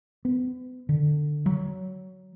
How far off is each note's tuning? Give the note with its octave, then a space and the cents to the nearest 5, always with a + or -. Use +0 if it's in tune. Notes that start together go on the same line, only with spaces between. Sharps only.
B3 +40
D3 +15
F#3 +15